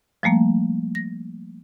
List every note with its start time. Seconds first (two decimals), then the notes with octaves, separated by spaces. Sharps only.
0.23 F3 G3 A3 A#3
0.95 A#6